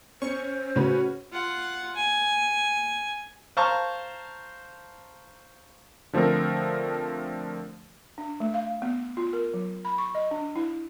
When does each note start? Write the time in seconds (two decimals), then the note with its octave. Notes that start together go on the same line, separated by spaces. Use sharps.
0.22 C#4 C5 C#6
0.76 A2 C#3 C#4 F#4 B4
1.32 F4 F#5
1.96 G#5
3.57 C5 F5 A5 A#5 C#6
6.13 D3 F3 A3 C4 A#4
8.18 D4
8.40 A3
8.54 F5
8.82 B3
9.17 F4
9.33 A#4
9.54 F#3
9.85 B5
9.98 C#6
10.15 D#5
10.31 D4
10.56 E4